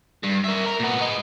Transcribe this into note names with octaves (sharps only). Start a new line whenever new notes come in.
G2
A#4 E5
A#4
A#2 B3
G#3 D#4